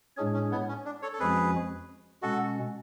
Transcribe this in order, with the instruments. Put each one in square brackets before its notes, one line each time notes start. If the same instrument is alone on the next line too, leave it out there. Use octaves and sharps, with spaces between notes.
[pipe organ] A2 G#3 D4 G#4 C#5 [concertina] C#4
[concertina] C#4
B3
C#4
D4
A4 C#5
A4
[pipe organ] F2 F3 G#3 C#4 F#4 [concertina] G#4 B4
[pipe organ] B2 G#3 C#4 [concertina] F#4 A4